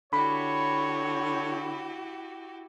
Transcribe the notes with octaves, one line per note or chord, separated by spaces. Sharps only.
D3 E4 F#4 G4 C#5 B5